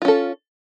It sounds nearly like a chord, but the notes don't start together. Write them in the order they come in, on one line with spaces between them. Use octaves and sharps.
F4 C#4 A4